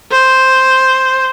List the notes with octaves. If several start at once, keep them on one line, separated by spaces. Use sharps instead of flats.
C5